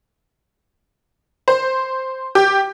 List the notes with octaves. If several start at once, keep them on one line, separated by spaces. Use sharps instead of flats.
C5
G4